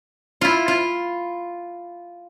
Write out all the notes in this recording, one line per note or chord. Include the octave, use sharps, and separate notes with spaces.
E4 F4
F4